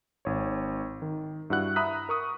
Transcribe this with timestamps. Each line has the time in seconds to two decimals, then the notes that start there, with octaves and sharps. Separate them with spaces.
0.25 G#1 C#5
1.02 D#3
1.50 G2 E4 F#4 F#5 F#6
1.76 E5 A#5 B5 D#6 F#6 B6
2.09 A#4 C#6 D#6